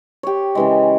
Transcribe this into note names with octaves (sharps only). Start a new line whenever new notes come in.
G4 C#5
C#3 E3 G#3